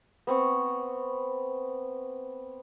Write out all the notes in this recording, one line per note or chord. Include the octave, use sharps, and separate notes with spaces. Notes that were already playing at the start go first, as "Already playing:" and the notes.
B3 C4 C#6